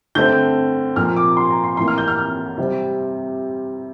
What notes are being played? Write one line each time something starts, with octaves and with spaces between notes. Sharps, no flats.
D3 A3 C4 G6
A#2 F3 A#3 F6
D6
C6
A#5
C6
A2 E3 A#3 C6
F6
G6
F6
F6
C3 G3 C4